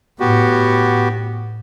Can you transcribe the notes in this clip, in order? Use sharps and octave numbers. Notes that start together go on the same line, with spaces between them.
A2 B3 F#4 G4